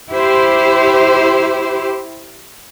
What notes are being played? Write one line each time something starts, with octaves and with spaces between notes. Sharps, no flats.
E4 G4 C5